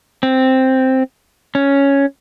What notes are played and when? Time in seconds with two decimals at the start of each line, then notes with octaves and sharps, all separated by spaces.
0.23 C4
1.55 C#4